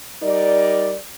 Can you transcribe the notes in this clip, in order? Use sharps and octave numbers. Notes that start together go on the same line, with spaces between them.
G3 D#4 A#4 D5